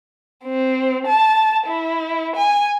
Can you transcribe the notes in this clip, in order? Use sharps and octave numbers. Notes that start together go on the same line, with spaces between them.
C4
A5
E4
G#5